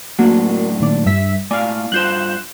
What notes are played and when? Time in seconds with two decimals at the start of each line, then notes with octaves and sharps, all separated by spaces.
0.19 F#2 A2 A#3 D4 F#4
0.80 A#2 D#3 D5
1.06 G2 E5 B6
1.51 A2 A#3 D5 F5 G#5
1.92 G2 F4 C5 F#6 G6 E7